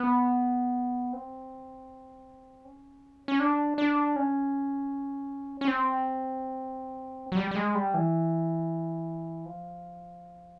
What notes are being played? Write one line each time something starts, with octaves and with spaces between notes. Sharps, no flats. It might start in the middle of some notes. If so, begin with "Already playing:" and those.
Already playing: B3
C4
C#4
C#4
D4
D4
C#4
C#4
C4
F#3
G3
G3
G#3
G3
E3
F3